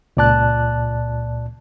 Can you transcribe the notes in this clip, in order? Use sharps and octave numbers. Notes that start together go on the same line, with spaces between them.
C#2 A#2 D5 A5 F#6